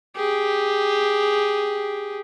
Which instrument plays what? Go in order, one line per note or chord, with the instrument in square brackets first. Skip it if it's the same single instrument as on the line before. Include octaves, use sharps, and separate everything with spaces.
[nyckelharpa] G4 G#4